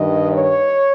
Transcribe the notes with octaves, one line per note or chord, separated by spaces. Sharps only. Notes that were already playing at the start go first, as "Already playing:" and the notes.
Already playing: G2 D#3 D#5
C#5